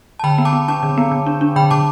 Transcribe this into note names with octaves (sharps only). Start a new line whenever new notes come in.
A5
D3 G5 B5
B3
A5 D6
B3
D4 A5 D6
D3
B3
D3
D4
D4
D3 G5 B5
D3 A5 D6